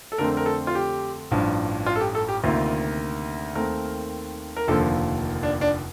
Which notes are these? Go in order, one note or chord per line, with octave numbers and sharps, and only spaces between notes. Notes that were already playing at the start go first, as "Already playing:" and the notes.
A4
F2 D3 A3 C4 A#4
A#4
A4
F4
G4
A1 G2 F3
F4
A4
G4
A4
G4
D2 C3 D#3 A#3 F4
D#2 D#3 A3 C4 A#4
A#4
F1 D#2 D3 F3 A#3 A4
D4
D4